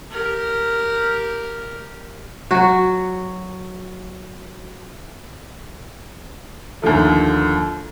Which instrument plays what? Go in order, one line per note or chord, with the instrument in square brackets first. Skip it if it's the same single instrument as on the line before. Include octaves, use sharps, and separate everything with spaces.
[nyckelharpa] G4 A#4
[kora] F#3 F#4
[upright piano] D#2 D3 F3 A3